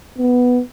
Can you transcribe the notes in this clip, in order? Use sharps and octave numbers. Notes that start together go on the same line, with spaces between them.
B3